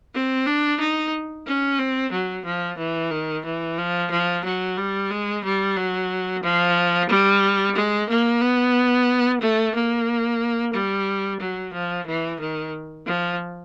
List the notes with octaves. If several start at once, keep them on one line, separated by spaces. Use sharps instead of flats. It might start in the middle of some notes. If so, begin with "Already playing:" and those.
C4
D4
D#4
C#4
C4
F#3
F3
E3
D#3
E3
F3
F3
F#3
G3
G#3
G3
F#3
F3
G3
G#3
A#3
B3
A3
A#3
G3
F#3
F3
E3
D#3
F3